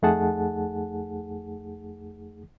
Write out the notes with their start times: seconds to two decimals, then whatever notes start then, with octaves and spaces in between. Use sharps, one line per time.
0.02 F2 A3 D#4 G#4 F#5 A5